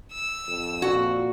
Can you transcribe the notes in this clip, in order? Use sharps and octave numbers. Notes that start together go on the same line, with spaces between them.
E6
F2
A#2 F#4